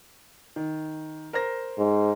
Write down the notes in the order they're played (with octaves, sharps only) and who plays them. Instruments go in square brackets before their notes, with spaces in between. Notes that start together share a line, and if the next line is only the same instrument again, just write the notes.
[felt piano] D#3
A#4 C5 A#6
[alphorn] G#2